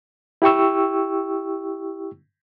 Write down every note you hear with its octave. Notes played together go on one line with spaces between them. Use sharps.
E4 G4 G5 C#6 E6